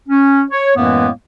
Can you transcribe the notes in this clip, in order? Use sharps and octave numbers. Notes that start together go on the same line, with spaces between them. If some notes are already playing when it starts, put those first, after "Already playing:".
C#4
C#5
F#2 A2 E3 G#3 A#3 B3